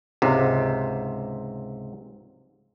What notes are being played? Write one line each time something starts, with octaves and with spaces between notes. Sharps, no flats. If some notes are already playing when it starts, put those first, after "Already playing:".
C#2 G#2 C3